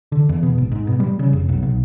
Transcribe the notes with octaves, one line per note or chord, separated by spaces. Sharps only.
D3
E2
B2
G#1
G#2
B2
G3
C#3
F1
B1
B1